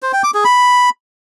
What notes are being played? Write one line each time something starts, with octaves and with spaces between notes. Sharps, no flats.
C5
G5
D6
G#4
B5